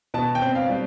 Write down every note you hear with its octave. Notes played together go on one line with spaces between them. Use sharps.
B2 A5
G5
C4
F5
G3